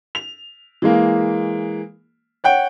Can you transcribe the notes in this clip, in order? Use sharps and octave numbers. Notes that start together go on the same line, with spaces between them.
F7
E3 G#3 A#3
C#5 F#5 G5